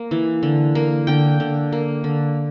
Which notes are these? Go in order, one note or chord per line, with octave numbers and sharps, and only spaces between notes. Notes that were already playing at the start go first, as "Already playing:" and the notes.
Already playing: A#3
E3
D3
A#3
D3 G5
D3
A#3
D3